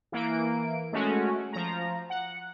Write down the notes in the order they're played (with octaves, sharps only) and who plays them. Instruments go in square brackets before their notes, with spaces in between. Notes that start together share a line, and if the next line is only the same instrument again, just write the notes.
[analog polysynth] E3 A#3 D7
G#3 A3 C#4 F#4
F3 A#5
F#5